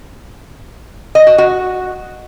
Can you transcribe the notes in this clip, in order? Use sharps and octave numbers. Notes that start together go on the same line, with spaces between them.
D#5
F#4
F#4